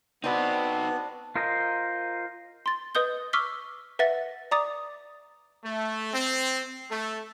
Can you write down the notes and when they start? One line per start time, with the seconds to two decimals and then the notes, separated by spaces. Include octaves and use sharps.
0.24 B3 C4 D4 D#4 F#4 B4
1.36 F4 A#4 C5 D#5
2.66 C6 A6
2.95 B4 D#5 D#6 G6 G7
3.33 C#6 D6 E6 F6 B6 G7
3.99 B4 E5 F#5 A6 A#6
4.51 D5 A#5 D6 D#6 A6
5.64 A3
6.14 C4
6.90 A3